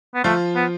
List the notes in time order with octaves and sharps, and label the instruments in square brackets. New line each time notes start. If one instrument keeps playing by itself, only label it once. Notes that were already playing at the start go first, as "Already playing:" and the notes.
[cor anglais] B3
[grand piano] F3 F4 [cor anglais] A3
[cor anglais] B3